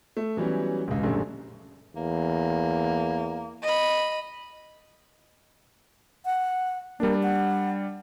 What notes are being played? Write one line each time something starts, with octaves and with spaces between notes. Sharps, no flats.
A3
E3 F#3 G3 B3 C#4
E1 C#2
A#1 F#2 D3 G3 A3
E2 A#3
D#5 B5
F#5
G3 A#3 D4
F#5